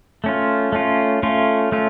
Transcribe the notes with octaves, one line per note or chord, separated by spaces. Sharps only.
A3 C#4 F4
A3 C#4 F4
A3 C#4 F4
A3 C#4 F4